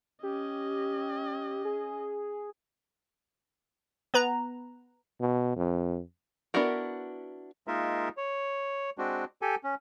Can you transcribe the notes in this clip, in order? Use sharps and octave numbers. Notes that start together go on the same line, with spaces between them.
C#4 G4 D#5
G#4
B3 B4 A#5
B2
F2
B3 D4 E4 F#4 A#4
G#3 A#3 D#4 F4 A#4 E5
C#5
G#3 C4 D4 F#4
G4 A4 G#5
C#4